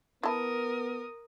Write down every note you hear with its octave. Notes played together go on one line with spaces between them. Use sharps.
B3 E4 A#4 A5 D#6